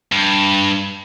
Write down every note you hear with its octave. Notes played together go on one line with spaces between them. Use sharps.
G2